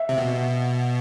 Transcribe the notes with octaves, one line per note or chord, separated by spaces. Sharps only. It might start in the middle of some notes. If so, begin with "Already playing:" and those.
Already playing: E5
C3
B2